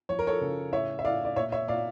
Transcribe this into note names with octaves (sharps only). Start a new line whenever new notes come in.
F3 C#5
A#4
A4 C#5
C#3
A2 C#5 E5
E5
A2 D5 F5
D5
A#2 C#5 E5
C#5 E5
A#2 D5 F5